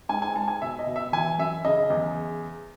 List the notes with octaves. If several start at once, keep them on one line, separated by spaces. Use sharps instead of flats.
G#2 G#5
G#5
G#2 A5
G#5
B2 E5
D#5
B2
E5
E3 G#5
F#2 E5
C#3 D#5
E2